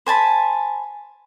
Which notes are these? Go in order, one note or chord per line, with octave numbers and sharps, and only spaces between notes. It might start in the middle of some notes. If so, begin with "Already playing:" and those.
C5 G#5 A5 B5